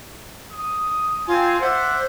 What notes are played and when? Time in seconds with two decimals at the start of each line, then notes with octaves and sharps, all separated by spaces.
0.51 D#6
1.27 C4 F4 G#5
1.61 C5 D5 E5 F#5